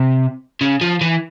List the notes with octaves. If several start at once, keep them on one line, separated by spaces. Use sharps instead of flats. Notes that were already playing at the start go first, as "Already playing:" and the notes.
Already playing: C3
C#3
F3
E3